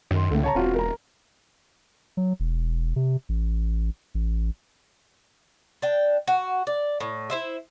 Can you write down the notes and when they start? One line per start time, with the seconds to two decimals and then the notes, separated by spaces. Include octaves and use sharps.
0.11 F#2 D#3 C6
0.31 C#2 A2 D3
0.44 C#5 A5 A#5
0.55 E1 C4 F4 F#4
0.75 A#4 A#5
2.17 F#3
2.40 E1
2.96 C3
3.29 A1
4.15 A1
5.82 D4 G5
6.28 F#4
6.67 D5
7.00 A2
7.30 E4 C5 E5